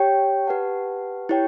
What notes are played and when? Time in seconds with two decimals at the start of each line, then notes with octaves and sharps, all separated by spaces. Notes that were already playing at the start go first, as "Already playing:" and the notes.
Already playing: G4 C#5 G5
0.47 G4 B4 F#5 A5
1.29 E4 G4 C#5 G5